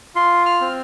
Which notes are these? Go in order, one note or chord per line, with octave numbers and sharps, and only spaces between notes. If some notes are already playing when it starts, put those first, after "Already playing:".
F4 C6
F6
C4